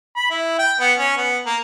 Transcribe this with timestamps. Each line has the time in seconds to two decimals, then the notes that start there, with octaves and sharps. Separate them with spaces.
0.17 B5
0.31 E4
0.59 G5
0.81 B3
0.98 C#4
1.17 B3
1.46 A#3